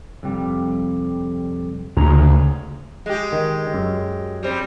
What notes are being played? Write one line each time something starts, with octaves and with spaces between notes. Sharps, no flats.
F2 C3 G3
D2 C#3 G#4 A#5
G#3 G4
D#3
F#2
G3 C4